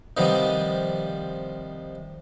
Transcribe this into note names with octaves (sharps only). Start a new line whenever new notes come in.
C3 D#3 F3 G3 B3